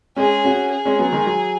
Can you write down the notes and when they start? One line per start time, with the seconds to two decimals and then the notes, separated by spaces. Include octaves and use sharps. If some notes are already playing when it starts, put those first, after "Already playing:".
0.16 G#3 C#4 G#4
0.45 C#4 F#4
0.72 G#4
0.85 G#3 C#4
0.99 F#3 B3
1.12 D#3 G#3
1.26 F#3